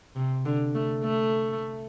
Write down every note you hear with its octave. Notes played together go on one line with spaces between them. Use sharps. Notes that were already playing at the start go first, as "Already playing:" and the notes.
C3
D3
A3
A3